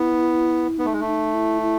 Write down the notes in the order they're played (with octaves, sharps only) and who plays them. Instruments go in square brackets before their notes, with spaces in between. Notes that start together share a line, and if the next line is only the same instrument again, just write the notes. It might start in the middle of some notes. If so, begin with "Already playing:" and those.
Already playing: [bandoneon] B3 [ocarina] E4
[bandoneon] B3 [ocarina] D#4
[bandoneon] A3
G#3
A3
[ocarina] D#4
E4
E4